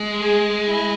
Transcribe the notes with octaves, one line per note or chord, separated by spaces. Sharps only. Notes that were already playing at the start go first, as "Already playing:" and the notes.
Already playing: G#3
G#4
E4